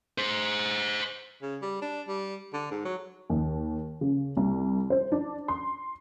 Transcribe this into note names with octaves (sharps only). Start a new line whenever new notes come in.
G#4 C5
C#3
G3
D4
G3
D3
G#2
F#3
D#2
C#3
C2
C5
D4
C6